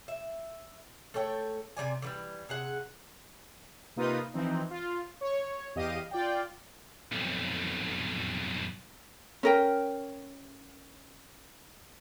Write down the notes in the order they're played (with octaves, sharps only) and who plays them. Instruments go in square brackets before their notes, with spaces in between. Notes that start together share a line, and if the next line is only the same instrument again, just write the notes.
[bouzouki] E5
A3 A4 C#5 G5
C3 G3 D5 G#5
D3 E3 G3
C3 G#4 F#5
[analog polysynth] C3 A#3 D#4 F4 B4 D#6
E3 F3 C4 D#4
F4
C#5
E2 G4 D#5 F5 D#7
F4 D5 G5
[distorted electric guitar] B1 F2
[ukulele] C#4 A#4 G5